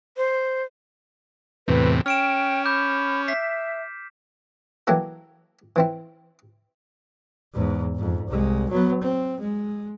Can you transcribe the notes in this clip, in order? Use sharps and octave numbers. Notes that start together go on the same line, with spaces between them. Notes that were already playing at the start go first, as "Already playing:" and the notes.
C5
E2 A2 C3 B4
C#4 G5 F6 D7 E7
B5 D6 G6 E7
E5 B6 C7
E3 F#3 A#3 E4 G4 A4
E3 C4 E4
E2 G#2
F2 G#2
C2 G#3
F#3 B3
C4
G#3